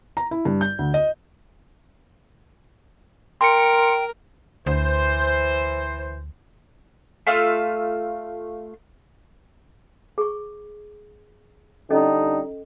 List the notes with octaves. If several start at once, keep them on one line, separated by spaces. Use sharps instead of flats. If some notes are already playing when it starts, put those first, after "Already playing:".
A#5
E4
G2
G6
D2
D#5
A#4 G5 C6 C#7
D2 E3 C5
A3 F4 F5 E6
G#4 C#6
D3 G3 C#4 D#4 A4 D#5